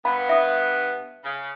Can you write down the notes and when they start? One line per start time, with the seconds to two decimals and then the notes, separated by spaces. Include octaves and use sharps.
0.05 G2 B3 F5 B5
0.29 E5 D#6
1.24 C#3